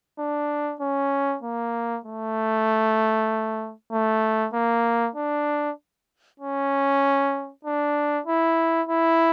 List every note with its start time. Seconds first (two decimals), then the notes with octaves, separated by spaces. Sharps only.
0.19 D4
0.81 C#4
1.43 A#3
2.05 A3
3.92 A3
4.54 A#3
5.15 D4
6.40 C#4
7.65 D4
8.26 E4
8.89 E4